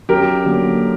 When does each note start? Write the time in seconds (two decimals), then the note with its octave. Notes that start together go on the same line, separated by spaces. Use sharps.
0.09 F#2 G4 A#4
0.44 D3 F#3 A#3